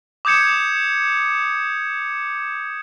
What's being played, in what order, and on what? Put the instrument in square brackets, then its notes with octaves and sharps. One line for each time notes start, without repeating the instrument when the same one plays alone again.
[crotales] D6 D#6 G6 G#6 C#7 E7